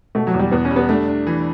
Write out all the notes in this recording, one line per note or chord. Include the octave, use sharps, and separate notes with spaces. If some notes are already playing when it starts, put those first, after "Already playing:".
B2 A3
F#3
E2
G3
E2 B3
C#4
G3
B3
A3 D4
D4
E3